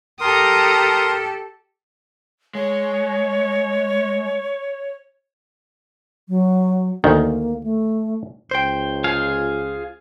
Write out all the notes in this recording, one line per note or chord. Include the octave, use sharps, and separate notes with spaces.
G4 A4 A#4 A#5 C6 D#6
G#3 C#5
F#3
D2 D#3 A#3
A3
C#2 C5 G5
F4 G#4 F5